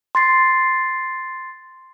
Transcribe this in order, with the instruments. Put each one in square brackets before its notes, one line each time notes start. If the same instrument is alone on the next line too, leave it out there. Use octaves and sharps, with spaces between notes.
[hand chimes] C6 A6 C7